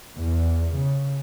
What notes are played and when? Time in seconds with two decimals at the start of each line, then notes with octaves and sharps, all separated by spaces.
0.20 E2
0.77 C#3